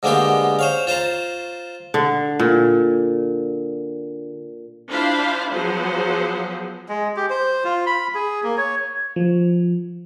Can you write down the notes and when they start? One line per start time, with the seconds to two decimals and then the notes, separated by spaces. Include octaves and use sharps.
0.03 G#2 D3 A#3 B3 G4 C6
0.59 C5 C#5 F5
0.87 F4 C5 A5 A#5
1.94 D3
2.40 A#2
4.90 D4 E4 F4 C5 F5 B5
5.53 F3 F#3 B3 G#4 C5
6.89 G#3
7.17 G4
7.30 C5
7.65 F4
7.86 B5
8.15 G#4
8.44 A#3
8.57 C#5
9.16 F3